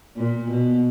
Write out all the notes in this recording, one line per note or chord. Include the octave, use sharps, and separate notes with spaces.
A#2
B2